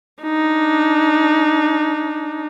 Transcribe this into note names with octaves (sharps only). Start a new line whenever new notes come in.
D4 D#4